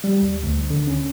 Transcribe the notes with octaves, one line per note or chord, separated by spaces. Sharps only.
G3
D#2
D2
D3
C#4